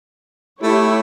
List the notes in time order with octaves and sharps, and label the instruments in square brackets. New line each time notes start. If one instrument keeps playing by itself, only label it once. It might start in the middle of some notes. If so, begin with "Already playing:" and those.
[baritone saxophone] A3 [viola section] E4 G4 C#5